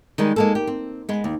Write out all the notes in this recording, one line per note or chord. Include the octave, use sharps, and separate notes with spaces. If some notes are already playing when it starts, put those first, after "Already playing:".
D#3 G3 G#3
G#3 A#3 A4
G4
C4
G#3 B3
D#2